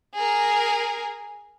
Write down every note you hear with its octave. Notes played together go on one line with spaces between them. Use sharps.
G#4 A#4